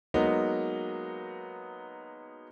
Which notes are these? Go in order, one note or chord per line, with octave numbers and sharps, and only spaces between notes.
F#3 G#3 A#3 B3 D#4